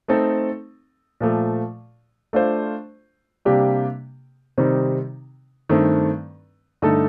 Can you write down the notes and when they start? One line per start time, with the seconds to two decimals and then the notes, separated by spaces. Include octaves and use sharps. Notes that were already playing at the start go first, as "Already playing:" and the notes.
0.08 A3 C4 D#4 A4
1.21 A#2 F3 A3
2.33 A3 D4 F4 C5
3.45 C3 G3 A#3 D4 G4
4.58 C3 D#3 G3 C4 D#4
5.69 G2 D#3 A3 C4
6.82 G2 D3 A3 D#4 A4